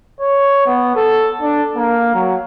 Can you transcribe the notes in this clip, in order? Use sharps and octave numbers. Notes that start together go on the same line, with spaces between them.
C#5
B3
A4
D4
A#3
F#3